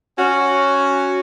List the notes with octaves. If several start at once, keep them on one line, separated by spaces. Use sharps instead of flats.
C#4 F#4